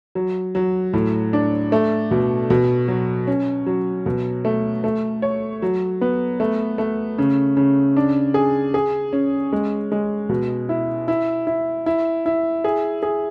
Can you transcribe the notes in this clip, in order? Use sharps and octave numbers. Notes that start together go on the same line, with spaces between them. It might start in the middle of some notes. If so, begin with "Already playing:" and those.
F#3
F#3
A2
D4
A3
B2
B2
F#3
C#4
F#3
B2
A3
A3
C#5
F#3
B3
A3
A3
C#3
C#3
D4
G#4
G#4
C#4
G#3
G#3
B2
E4
E4
E4
E4
E4
G#4
G#4